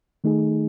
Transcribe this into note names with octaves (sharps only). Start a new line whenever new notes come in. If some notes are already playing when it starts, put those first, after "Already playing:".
D#3 A3 D#4 G#4